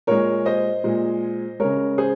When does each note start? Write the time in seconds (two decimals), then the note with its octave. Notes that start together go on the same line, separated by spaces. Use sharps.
0.07 A#2 G#3 A#4 C#5
0.46 C5 D#5
0.84 A#2 G#3
1.60 C#3 G#3 A#4 C#5
1.98 G#4 C5